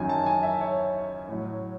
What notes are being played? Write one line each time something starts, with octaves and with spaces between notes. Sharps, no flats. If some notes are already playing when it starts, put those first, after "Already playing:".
Already playing: F#2 D#3 F#3 G#5
A5
G#5
E5
C#5
A2 F#3